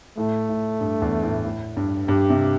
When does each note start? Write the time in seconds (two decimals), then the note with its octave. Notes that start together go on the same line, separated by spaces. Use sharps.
0.17 A2 A3
0.49 A2
0.81 G2
1.02 E2
1.23 A2
1.45 A2
1.77 G2
2.08 G2 G4
2.30 C3